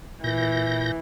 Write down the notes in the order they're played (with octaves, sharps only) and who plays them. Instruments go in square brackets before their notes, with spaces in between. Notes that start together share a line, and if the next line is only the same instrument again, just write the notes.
[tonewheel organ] A#2 G6 A#6 [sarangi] E3